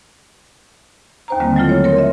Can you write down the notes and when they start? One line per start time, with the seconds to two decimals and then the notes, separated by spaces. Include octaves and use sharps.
1.28 D#2 C5 A#5
1.40 D3 D#3 G3 G#3 A#3 C4
1.56 F#3 G#3 A3 E4 F4 A4
1.69 C#5
1.84 A#4 C#5 C6
1.97 D#5 E5